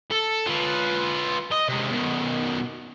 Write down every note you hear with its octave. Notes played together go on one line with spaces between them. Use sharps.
A4
F4 B4
D#5
C3 G#3
B2 D#3